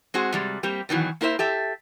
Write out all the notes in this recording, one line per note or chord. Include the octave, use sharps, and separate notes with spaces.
G#3 C4 F#4 G#4
C3 G3 G#3
G3 A#3 C4 G4
B2 D#3 E3 F#3
A#3 E4 A#4 C5 E5
G4 A4 E5